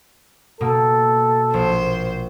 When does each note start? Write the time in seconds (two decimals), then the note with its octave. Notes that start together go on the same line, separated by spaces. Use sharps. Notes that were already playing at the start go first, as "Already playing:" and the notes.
0.61 B2 A#3 A4
1.54 A#1 C5